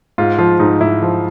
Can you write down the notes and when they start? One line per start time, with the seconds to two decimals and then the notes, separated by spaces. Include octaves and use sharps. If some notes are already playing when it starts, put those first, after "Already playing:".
0.18 G#2 F4
0.38 F3 F4
0.60 G#2 D#4
0.81 G#2 E4
1.02 F3